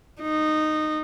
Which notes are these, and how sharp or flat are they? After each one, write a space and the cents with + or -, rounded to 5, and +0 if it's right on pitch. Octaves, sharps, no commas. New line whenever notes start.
D#4 -15